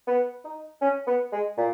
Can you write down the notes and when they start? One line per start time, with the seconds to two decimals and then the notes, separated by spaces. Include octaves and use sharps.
0.07 B3
0.44 D#4
0.81 C#4
1.07 B3
1.32 G#3
1.57 A#2